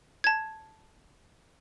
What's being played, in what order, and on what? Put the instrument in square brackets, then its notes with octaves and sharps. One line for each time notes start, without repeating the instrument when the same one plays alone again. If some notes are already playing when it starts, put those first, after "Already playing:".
[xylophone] A5 G#6